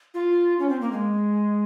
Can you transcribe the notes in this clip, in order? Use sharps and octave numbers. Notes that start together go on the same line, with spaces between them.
F4
C#4
C4
A#3
G#3